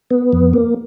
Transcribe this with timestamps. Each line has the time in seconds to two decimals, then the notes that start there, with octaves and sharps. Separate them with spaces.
0.11 B3
0.33 F2
0.53 A#3